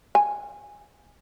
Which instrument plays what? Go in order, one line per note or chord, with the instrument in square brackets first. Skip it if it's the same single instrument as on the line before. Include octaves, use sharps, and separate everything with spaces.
[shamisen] G#5